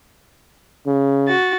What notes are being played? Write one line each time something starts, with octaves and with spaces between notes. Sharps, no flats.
C#3
F#4 A6